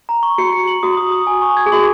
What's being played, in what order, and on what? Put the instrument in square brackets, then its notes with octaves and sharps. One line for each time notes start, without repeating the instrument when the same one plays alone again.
[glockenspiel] A#5
C#6
[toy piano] F#4 [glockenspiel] C#7
[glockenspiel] C#7
F#7
[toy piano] F#4 [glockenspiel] D#6
[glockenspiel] D#6
D#6
G#5
C#6
G#6
[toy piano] G#4
[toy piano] F#4 [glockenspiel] F#7